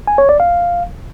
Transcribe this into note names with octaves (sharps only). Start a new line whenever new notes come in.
G#5
C#5
D5
F5